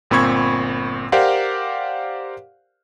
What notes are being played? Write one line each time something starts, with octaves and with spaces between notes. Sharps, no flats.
G1 A#2 C4 B5 C#6 G#6
G4 A#4 C5 D5 F5 F#5